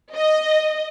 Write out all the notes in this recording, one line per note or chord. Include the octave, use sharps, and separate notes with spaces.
D#5